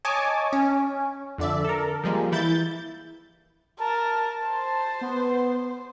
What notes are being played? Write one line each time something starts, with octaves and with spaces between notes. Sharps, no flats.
C#5 D#5 G#5 A5 D6
C#4
F2 D3 D5 E5
A4 A#4
F3 G3 G#3 A#3
E3 E4 G6 A6
A#4 A5
C5
B3